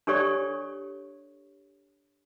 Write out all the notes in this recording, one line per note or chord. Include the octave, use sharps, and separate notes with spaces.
D4 G4 A4 C#5 D5 C#6